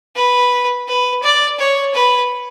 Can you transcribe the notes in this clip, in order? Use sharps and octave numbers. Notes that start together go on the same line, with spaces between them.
B4
B4
D5
C#5
B4